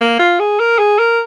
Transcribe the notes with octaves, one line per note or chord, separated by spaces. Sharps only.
A#3
F4
G#4
A#4
G#4
A#4